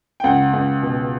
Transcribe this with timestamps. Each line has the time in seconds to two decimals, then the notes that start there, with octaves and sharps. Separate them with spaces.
0.20 G5
0.24 C#2 F#5
0.53 C#2
0.82 B2